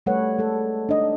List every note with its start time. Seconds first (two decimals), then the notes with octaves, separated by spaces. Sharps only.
0.06 G3 A3 A4 B4 C#5 F#5
0.39 G#3 A3 A4
0.89 D4 D#5